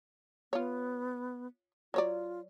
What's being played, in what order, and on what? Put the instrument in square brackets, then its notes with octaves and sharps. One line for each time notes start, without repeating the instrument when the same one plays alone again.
[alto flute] B3 [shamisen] F4 C#5
[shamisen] F#3 C#5 D5 [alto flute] F4